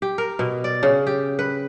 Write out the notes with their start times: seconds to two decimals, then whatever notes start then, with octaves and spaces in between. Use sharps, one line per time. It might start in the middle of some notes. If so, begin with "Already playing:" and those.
0.02 G4
0.18 A#4
0.39 B2
0.64 D5
0.83 C#3
1.07 G4
1.39 B4